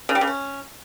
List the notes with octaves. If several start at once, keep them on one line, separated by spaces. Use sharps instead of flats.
C#3
G3
C#3
C#4